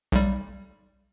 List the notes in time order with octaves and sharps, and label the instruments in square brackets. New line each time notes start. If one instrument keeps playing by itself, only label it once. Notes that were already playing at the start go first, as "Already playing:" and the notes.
[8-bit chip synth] B1 G3